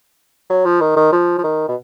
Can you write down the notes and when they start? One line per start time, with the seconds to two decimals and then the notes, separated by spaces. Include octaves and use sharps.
0.50 F#3
0.65 F3
0.81 D#3
0.96 D#3
1.12 F3
1.39 F3
1.44 D#3
1.68 B2